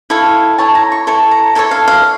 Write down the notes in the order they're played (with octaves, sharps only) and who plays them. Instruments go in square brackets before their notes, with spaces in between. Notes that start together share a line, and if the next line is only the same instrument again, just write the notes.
[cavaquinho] E4 A4 C#5 F5
E4 A4 C#5 A5
A#5
C#6
E4 A4 C#5 C#6
A#5
E4 A4 C#5 A5
F5
F5